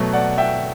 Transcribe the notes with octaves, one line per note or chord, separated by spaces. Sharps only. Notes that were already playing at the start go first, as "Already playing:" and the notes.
Already playing: B2 F#3 A3
D5 F#5
E5 G5